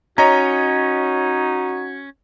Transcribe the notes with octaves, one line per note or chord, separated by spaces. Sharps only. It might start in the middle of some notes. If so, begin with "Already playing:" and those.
C#4 D#4 F#4 C#5 D#5 A#5